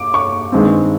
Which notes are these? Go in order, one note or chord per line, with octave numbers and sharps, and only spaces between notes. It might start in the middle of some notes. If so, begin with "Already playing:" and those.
Already playing: D6
C#6
G2 D#3 G#3 C4